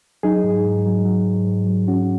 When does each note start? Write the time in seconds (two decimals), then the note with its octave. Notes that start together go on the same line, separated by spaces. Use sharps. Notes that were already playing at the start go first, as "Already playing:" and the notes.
0.23 F#3 D#4 G#4
0.44 G#2
0.65 G#2
0.86 F#3
1.05 F#3
1.26 G#2
1.47 G#2
1.66 F#3
1.88 F#3 C#4 F#4